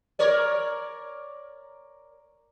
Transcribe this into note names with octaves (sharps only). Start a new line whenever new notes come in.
A#4 C#5 D5